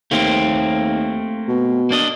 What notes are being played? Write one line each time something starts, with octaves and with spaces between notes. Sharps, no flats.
D#2 A3 A#3 C4
B2
A#3 D4 D#5